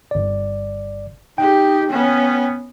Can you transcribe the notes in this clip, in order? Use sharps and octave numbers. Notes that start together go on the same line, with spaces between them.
G1 D5
D#4 G4 G5
B3 C#4